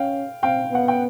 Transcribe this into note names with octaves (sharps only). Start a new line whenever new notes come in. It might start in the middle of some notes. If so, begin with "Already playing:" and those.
Already playing: C#4 F5 G5
C4 F5 G5
B3 F#5
G5